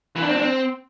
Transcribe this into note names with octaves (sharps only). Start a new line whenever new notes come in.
E3
D4
C4
D4
C4